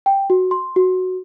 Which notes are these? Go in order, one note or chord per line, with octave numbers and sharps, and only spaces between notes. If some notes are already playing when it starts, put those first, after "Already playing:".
G5
F#4
C6
F#4